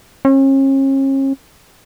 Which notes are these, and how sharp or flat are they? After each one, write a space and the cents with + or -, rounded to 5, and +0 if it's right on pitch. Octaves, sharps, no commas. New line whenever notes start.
C#4 -40